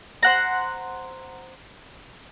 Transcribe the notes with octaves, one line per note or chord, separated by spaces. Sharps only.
C5 F#5 A#5